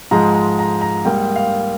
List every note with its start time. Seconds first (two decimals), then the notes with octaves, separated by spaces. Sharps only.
0.11 G#2 F3 G#3 A#5
0.35 A#5
0.59 A#5
0.81 A#5
1.05 G#2 G3 A#3 G5
1.36 F5